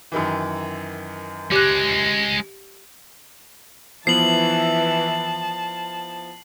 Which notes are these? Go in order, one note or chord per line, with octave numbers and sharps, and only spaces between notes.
F#2 D#3 E3
G#3 C#4 G4 F#6
E3 F3 B3 E4 A5 C7 F#7